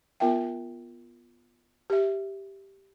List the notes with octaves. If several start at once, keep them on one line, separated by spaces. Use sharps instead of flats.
B3 F4 A#4 E5 G5
G4 E5